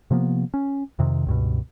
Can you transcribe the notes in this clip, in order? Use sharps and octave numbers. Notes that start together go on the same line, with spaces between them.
C3 F3 A#3 B3
C#4
F2 C3 D#3
C#2 G2 B2